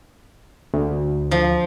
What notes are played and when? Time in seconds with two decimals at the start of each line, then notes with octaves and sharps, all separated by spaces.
0.74 D2
1.31 F3